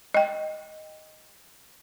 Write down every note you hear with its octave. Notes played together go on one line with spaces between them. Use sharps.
D#5 G5